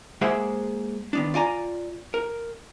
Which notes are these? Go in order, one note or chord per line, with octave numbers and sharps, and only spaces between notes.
G#3 A#3 G#4 C5 E5 F#5
D#3 B3 D4
F4 D5 G#5 A#5
A#4